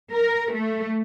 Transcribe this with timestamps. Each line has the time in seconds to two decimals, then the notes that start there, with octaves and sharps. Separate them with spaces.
0.13 A#4
0.53 A3